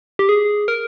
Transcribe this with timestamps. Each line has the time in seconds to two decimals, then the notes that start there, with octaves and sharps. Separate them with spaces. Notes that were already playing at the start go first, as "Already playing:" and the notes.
0.19 G4
0.29 G#4
0.68 A#4